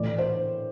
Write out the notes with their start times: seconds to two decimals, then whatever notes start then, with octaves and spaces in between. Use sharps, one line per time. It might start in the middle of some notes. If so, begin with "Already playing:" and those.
Already playing: A2 E3 D5
0.18 C5